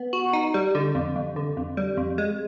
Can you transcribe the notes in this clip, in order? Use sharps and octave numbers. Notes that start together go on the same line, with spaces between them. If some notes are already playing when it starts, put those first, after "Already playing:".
Already playing: B3
F#4
D#4
G3
D3
F2
F2
D3
F2
G3
F2
G#3